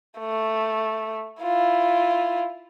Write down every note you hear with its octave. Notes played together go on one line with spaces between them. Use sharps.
A3
E4 F4